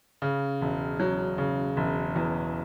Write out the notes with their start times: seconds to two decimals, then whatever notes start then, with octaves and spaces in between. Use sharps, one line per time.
0.22 C#3
0.61 E1
1.00 F#3
1.38 C#3
1.77 E1
2.16 E2